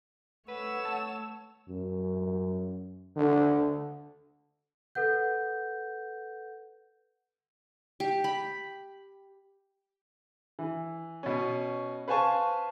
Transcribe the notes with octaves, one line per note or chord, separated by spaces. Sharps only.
A3 B4 C#5 F#5 E6
A5
F#2
D3
A4 B4 F#5 G6
G4
B5
E3
B2 C#4
B4 C5 F5 G#5 A5 C#6